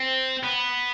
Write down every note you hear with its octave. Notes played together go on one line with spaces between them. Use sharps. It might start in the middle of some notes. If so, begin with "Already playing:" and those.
Already playing: C4
B3